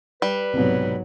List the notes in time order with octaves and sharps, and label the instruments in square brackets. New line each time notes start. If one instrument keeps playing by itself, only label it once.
[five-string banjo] G3 [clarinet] B4
[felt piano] C2 B2 B3 [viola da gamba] G#2 F#3